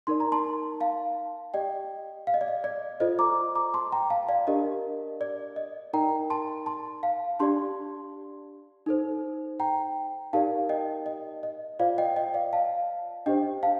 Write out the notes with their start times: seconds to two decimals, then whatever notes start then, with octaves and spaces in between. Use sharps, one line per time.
0.07 D#4 A#4 D5 C6
0.20 A#5
0.32 A5 C6
0.80 F5 A5
1.54 G4 D5 D#5 G5
2.27 F5
2.34 D#5
2.41 D5
2.48 D#5
2.64 D5
3.00 F4 A4 C5 D#5
3.19 A#5 D6
3.55 A#5 D6
3.74 A5 C6
3.92 G5 A#5
4.10 F5 A5
4.29 D5 F5
4.47 D4 G4 A#4 D5 D#5
5.21 D5
5.56 D#5
5.93 D#4 A#4 D5 G5 A#5
6.30 A5 C6
6.66 A5 C6
7.03 F5 A5
7.40 D4 G4 D5 A5 C6
8.86 D#4 A4 C5
9.60 G5 A#5
10.33 D#4 G4 A#4 D5 F5 A5
10.69 D#5 G5
11.06 D#5
11.43 D#5
11.79 F4 C5 D5 F5
11.98 D#5 G5
12.16 D#5 G5
12.34 D5 F5
12.53 F5 A5
13.26 D4 G4 C5 D#5 G5
13.63 F5 A5